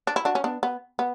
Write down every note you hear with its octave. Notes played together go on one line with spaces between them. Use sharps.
D4
E4
D4 F#4
C#4
B3 D4
B3
B3